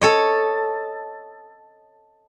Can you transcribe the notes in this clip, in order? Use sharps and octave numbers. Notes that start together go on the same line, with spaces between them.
A4 C#5 D#5